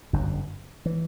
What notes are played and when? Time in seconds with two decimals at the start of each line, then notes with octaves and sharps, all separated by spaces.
0.13 G1 F#2 D3
0.86 E3